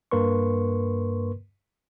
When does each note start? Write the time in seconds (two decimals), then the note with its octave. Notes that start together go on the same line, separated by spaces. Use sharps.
0.11 G2 A#3 A#4 B4 C6 C#6